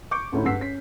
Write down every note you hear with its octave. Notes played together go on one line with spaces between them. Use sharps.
C#6 D6 G6 C#7
D2 A2 C#4 D#4 B5
G2 F#5 E6 B6 C7
C#4 B6